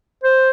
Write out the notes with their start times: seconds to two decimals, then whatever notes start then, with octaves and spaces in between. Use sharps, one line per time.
0.24 C5